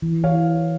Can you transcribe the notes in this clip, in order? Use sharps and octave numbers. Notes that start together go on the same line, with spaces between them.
E3
E3 C#5 F5